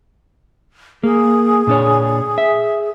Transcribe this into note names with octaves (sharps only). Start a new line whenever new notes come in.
A#3 G#4
A#2 D4 C#5
E5